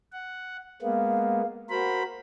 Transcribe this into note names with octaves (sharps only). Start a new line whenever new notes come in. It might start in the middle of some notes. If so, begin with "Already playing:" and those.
F#5
G#3 A#3 B3 F5
F#4 A#4 C5 B5